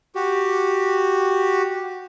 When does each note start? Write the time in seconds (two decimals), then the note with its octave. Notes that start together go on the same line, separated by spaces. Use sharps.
0.15 F#4 G4